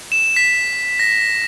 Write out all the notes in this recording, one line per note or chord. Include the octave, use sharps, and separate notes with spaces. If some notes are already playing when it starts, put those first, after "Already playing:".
E7
B6
A#6